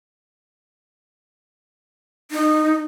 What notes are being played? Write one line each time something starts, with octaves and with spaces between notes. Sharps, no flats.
D#4